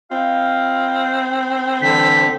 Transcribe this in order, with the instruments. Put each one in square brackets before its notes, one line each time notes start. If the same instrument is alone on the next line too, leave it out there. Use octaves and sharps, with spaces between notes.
[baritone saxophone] C4 [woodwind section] F4 D#5 F5
[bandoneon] D3 [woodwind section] E3 G3 [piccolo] B6